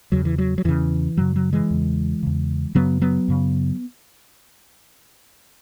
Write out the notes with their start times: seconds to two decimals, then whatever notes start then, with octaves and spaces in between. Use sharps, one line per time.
0.12 E2 C#3 F#3
0.25 E3
0.38 F#3
0.58 F#3
0.64 E2 C#3 E3
1.17 F#2 C#3 F#3
1.36 F#3
1.53 E3 G#3
1.71 E2 C#3
2.23 E2 C#3
2.75 F#2 C#3 F#3 B3
3.01 F#3 B3
3.28 F#2 C#3